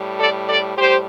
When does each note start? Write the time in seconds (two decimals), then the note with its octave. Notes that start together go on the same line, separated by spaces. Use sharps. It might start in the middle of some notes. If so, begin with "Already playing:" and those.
Already playing: A2 G3
0.20 A4 D5
0.49 A4 D5
0.78 A2 G3 G4 C5